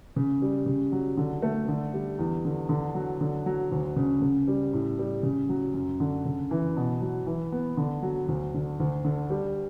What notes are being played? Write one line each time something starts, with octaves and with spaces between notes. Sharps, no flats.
C#3
G3
C#3
F#3
D3
A3
D3
G3
E2
D3
D3
F#3
D3
F#3
D2
C#3
C#3
G3
A2
G3
C#3
F#3
F#2
D3
C#3
E3
B2
F#3
E3
B3
D3
F#3
D2
D3
D2
D3
G3